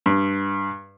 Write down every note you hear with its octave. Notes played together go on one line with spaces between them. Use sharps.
G2